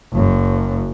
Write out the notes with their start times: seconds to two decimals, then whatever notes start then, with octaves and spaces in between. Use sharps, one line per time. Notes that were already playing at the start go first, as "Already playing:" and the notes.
0.13 F#1 F#2